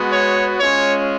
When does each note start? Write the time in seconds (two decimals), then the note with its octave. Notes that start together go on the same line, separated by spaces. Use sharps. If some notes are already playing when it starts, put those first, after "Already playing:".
Already playing: G#3 B3 F#4
0.11 C#5
0.60 G#3 C#4 F4 C#5